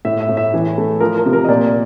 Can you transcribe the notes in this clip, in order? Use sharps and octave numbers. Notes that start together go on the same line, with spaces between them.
A2 E5
E5
A2
E5
E3
A3
F3 A#4
A#4
C3
A#4
D#5
A#2 D5